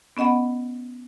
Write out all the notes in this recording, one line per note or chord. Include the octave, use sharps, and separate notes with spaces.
B3 C#4 D#5 F#5 B5